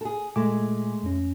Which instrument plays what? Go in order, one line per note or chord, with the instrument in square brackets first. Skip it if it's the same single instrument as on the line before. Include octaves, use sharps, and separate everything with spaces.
[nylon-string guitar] G#4 A4
[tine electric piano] A#2 G#5 D6 [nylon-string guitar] G#3 A3
[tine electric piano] F2 C#4